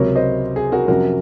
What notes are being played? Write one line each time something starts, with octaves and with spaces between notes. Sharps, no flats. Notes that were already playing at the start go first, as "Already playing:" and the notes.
Already playing: C#2 C3 F#3 A#4 C#5
C5 D#5
G#4
F#4 A#4
F2 C3 F#3 C#4 F#4 A#4